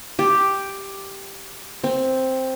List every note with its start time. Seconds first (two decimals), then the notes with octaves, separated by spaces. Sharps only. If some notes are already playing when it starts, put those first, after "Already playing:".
0.19 G4
1.84 C4